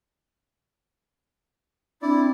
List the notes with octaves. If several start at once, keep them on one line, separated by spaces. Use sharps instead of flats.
C4 D4 E4 D5